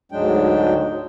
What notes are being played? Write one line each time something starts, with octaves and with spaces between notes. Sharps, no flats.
D2 G#2 F#3 G#3 D4 G5